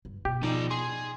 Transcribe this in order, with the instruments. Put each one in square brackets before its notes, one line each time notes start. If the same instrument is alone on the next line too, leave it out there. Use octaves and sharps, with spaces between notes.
[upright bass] G2
[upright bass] B2 [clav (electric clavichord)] G4
[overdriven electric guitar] F3 D5 [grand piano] D#4
[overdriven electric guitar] G#4 [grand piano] C6